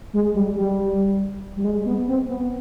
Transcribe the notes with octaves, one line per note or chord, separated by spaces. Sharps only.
G#3
G3
G3
G3
G#3
B3
C4
B3